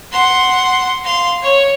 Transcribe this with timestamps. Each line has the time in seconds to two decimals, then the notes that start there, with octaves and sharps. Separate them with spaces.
0.12 F#5 C6
1.04 F5 C6
1.42 C#5